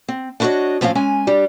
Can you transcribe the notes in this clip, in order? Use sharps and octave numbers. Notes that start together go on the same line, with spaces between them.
C4
D4 E4 F#4 A#4 C#5 D#5
A2 F3 C4 C#4 F5
G#3 C#4 G#5
G3 D4 G4